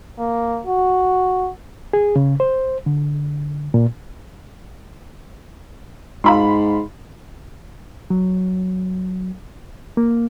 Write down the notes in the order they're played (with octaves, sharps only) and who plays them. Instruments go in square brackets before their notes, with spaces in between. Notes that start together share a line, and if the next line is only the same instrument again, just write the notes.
[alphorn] A#3
F#4
[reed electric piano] G#4
C#3
C5
D3
A#2
[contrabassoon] G#2 [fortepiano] F5 B5 C6
[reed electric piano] F#3
A#3